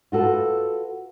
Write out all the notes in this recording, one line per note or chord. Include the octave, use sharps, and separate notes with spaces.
F4 F#4 A4 B4